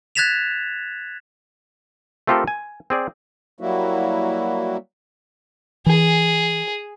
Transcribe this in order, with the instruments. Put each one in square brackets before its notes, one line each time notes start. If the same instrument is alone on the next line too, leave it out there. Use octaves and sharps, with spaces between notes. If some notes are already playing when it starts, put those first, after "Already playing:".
[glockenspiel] F#6 G#6 A6 B6 E7 F7
[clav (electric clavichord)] A3 C4 F4 G4 A4 A#4
G#5
C4 G#4 D5
[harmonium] F#3 G3 A#3 E4 F#4
[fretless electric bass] E3 [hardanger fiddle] G#4